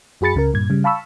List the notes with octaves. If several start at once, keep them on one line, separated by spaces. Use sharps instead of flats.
F#2 F#4 G#4 B5 A6 C#7
C#2 C#3 A#4
G2 A#2 G#6
C#3 G3
F5 A5 B5 C#6 E6